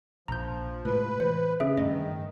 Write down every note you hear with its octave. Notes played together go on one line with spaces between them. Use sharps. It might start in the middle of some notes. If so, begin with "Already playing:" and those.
A#1 F3 A#5 G6
A2 C3 G#3 B4
E3 C5
C#3 C#4 G#4 E5
G2 D#3 A3 D#5